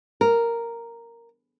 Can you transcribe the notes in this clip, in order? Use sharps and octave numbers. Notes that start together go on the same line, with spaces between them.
A#4